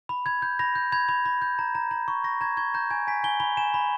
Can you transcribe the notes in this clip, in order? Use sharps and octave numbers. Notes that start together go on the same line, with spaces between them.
B5
B5 G#6
G6
B5 A#6
G6
B5 G#6
B5
B5
G6
A#5
A#5
A#5
C#6
C#6 A#6
A#5 G#6
C#6 G#6
A#5 G6
G#5 G#6
G#5 B6
G#5 G7
B5 G7
G#5 E7
B5